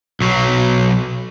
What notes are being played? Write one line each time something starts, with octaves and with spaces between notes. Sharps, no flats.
B1 F#3